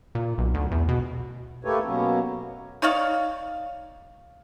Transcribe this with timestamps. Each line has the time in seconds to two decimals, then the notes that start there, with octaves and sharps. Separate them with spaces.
0.15 A#2
0.38 B1
0.54 D2
0.71 E2
0.89 B2
1.65 A3 A#3 G4 A4 B4 C#5
1.85 B2 F#3 A#3 B3 C#4
2.82 D#4 C#5 D5 F5